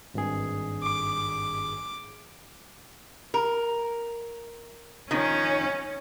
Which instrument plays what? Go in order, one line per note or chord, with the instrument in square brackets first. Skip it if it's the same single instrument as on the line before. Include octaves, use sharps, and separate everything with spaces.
[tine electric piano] G#1 G2 G#4
[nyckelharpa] D6
[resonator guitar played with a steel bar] A#4
[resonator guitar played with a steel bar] D#3 F3 [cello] C#4